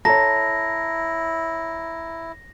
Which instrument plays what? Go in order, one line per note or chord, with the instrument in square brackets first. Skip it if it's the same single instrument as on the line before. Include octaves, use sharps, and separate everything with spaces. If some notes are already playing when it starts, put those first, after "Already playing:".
[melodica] E4 [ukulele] A4 [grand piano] C#5 A#5 [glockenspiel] A#6